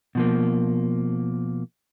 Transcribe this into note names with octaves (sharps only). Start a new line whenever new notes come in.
B2 F3 A#3